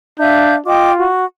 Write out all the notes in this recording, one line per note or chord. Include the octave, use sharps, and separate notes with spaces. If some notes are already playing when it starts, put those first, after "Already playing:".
D4 E5 F5 G6
F4 D#5 G5 D6
F#4